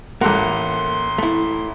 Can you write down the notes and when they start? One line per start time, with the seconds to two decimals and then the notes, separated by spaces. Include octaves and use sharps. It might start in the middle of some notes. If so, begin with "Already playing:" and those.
0.21 A1 A#3 A4 F#5 C6
1.18 A3 E4